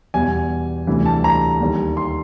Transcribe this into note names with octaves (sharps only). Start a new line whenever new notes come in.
E2 B2 G3 G#5
D2 C3 E3 G3
A5
A#5
D#2 D#3 G3
C6